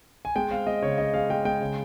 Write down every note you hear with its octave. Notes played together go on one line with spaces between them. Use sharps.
G#5
G#3 G5
C4 F5
G#3 D#5
C#3 C#5
C#3 D#5
G#3 F5
G#3 G5
G#3 G5
C#3